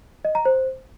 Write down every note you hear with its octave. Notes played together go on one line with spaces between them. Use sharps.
D#5
A#5
C5